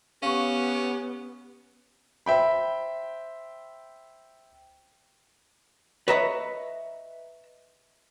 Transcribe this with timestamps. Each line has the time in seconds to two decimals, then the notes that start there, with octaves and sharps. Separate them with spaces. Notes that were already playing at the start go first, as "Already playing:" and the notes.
0.23 B3 C#4 G4 F5 C#6
2.26 C5 E5 G5 B5
6.08 B4 C#5 D#5 E5 A#5 B5